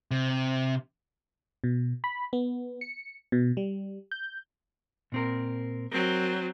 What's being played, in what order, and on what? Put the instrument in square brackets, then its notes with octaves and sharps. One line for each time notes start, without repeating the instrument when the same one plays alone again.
[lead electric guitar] C3
[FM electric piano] B2
B5
B3
C#7
B2
G3
G6
[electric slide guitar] A#2 C4 A#4
[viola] F#3 C4 [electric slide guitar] A#4